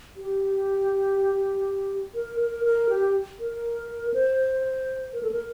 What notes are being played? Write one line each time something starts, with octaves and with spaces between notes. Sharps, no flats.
G4
A#4
A#4
A#4
G4
A#4
C5
A#4
A4
A#4